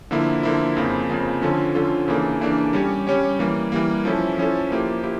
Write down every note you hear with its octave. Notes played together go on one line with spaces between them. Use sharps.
D3 F3 A#3 E4
D3 F3 A#3 E4
F2 C#3 F3 A#3
F2 C#3 F3 A#3
D3 F3 C#4 F4 A4
D3 F3 C#4 F4 A4
C#3 E3 A#3 D4 A4
C#3 E3 A#3 D4 A4
G3 C#4 G4 C#5
G3 C#4 G4 C#5
E3 G3 A#3
E3 G3 A#3
F3 C#4 E4 A4
F3 C#4 E4 A4
F3 A#3 E4 G4
A#3 E4 G4